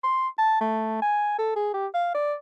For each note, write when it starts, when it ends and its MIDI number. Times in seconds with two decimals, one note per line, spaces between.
0.04 0.28 84
0.38 0.57 81
0.61 1.01 57
1.02 1.37 80
1.39 1.54 69
1.56 1.72 68
1.74 1.87 67
1.94 2.12 77
2.15 2.34 74